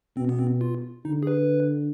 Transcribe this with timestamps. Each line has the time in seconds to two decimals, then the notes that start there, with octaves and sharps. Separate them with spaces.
0.17 B2 C4
0.29 B3
0.39 C4
0.61 F4
1.05 D3 D#4
1.23 G#4
1.27 B4